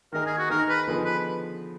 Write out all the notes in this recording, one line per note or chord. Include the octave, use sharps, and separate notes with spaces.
D#3 A#3 D#4 G#4 A#4
G#4
F#4
D#3 A#3 D#4 G#4 A#4
B4
D3 F3 B3 D#4 G#4
B4